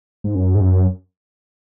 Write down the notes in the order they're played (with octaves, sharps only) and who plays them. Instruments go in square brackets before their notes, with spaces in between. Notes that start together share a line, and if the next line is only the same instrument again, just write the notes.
[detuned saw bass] G#2
F#2
G#2
F#2